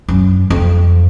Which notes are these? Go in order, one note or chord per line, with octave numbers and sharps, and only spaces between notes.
F#2
F2